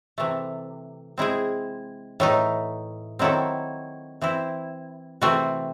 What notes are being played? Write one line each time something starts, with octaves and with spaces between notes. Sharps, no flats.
C3 E3 A3
G#3 C4 E4 G#4
A2 E3 A3 D#4
D#3 F#3 C4 E4 A4
E3 C4 E4
C3 E3 A3 C4 F#4